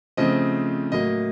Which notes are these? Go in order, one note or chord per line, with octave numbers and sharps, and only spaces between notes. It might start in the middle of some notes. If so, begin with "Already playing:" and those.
C#3 F3 A3 C4 D#5
A2 F#3 A#3 D#5